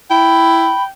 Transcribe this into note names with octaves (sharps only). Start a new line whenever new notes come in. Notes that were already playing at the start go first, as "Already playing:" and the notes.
E4 G5 B5